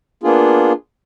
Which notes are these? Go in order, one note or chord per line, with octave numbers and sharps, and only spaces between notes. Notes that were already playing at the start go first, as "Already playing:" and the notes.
A#3 B3 D4 F4 G#4